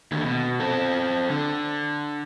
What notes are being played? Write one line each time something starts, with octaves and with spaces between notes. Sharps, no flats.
D#2 D3
B2
C4 A4
D3